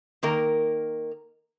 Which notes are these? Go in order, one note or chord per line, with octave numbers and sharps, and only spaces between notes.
D#3 A#3 A#4